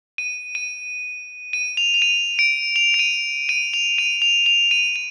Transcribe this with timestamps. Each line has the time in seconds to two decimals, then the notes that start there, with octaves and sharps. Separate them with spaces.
0.18 D#7
0.55 D#7
1.53 D#7
1.77 F7
1.94 F7
2.02 D#7
2.39 D7
2.76 F7
2.94 D7
2.99 D#7
3.49 D#7
3.74 F7
3.98 D#7
4.22 F7
4.46 F7
4.71 D#7
4.96 D#7